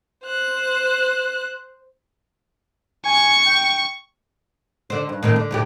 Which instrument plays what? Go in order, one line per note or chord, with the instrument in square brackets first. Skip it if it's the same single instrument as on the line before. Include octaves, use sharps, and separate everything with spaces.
[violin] C5 F#6
[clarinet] G#5 [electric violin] C#6
[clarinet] G5
[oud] D3 C5
G2
A2 D#3 C4
D3
D2 A2 G4